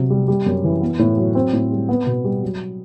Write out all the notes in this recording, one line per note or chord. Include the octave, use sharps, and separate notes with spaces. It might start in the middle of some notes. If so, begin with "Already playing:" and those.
Already playing: C3 F#3 C4
G3
G3
F#2
E3
B3
A2
F#3
C4
A2
G3
B3
B2
G3
F#3